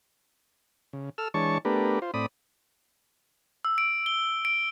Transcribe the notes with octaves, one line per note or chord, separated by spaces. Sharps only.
C#3
A4 E6 F6
E3 G#3 D4 C#5 A5 C#6
A3 B3 D4 G4 A#4 B4
F4 C5
A2 C4 D5 B5 D#6
E6
D7
G7
D7